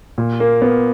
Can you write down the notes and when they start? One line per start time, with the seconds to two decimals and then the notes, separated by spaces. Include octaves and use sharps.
0.18 A#2
0.40 A#3
0.62 B3